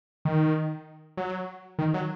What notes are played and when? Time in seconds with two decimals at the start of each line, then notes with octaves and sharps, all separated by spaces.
0.25 D#3
1.17 F#3
1.79 D#3
1.94 F#3